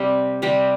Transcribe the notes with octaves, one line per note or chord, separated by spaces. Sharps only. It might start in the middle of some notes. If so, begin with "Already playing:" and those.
Already playing: C3 G3 C4 G4
C3 G3 C4 G4